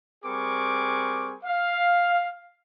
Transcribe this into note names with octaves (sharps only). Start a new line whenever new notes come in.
G3 C4 G#4 A#4 C#6 D6
F5